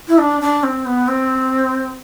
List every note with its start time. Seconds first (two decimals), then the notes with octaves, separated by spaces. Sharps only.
0.08 E4
0.18 D4
0.41 D4
0.63 C4
0.86 B3
1.08 C4